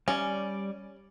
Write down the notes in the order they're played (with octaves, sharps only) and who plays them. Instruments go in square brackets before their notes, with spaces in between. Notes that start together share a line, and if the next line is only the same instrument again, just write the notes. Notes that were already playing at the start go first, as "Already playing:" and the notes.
[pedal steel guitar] G3 D5 [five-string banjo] C#4